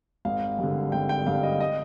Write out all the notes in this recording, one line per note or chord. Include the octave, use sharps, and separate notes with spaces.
G#1 F5
G2 D3
G#1 G5
G5
G2 D3 F5
D#5
D#5